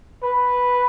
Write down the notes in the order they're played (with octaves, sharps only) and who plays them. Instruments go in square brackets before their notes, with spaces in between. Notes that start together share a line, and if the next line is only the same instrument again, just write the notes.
[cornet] B4